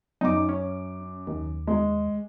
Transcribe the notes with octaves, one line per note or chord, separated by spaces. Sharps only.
F#2 D#4 D6
C#4
D#2
G#3